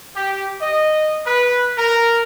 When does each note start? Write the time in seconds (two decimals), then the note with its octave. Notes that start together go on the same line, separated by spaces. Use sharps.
0.15 G4
0.61 D#5
1.26 B4
1.78 A#4